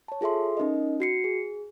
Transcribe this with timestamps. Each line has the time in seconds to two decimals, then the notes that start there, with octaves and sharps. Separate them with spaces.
0.08 C#5 A5
0.21 F4 G#4 A4 E5 C6
0.57 C#4 D#4 A#4 D#5
1.00 F#4 C7 C#7
1.24 G#4